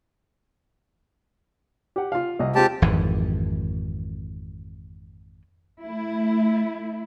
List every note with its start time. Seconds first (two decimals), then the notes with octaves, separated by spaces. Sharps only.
1.96 G4 F#5
2.12 F4 F5
2.39 C2 D#5
2.55 G#3 C4 F4 G4 A5
2.82 G#1 F2 E3
5.82 A3 E4